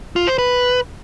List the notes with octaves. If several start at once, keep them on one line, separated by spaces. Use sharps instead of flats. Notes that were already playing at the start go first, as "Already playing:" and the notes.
F4
C5
B4